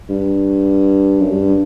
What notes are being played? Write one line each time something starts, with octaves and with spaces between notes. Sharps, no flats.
G2
F#2
G2